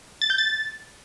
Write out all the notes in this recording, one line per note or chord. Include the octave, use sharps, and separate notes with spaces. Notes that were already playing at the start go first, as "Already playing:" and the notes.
A6
G6
A6